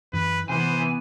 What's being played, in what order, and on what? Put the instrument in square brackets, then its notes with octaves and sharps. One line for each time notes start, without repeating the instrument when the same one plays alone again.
[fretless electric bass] F#2 E3 [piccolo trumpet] B4
[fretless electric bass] C3 [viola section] E3 B3 [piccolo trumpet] C5 [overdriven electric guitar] G#5